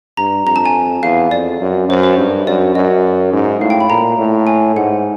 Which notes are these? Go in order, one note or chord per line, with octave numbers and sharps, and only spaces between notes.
G2 A#5
F2 A#5
A5
G#5
E2 F5
F2 D5
F#2
F#2 C5
C5
G2
F#2 D5
F#2 D#5
G#2
A2 F5
G5
B5
A#2 A#5
A2
G#5
G#2 F#5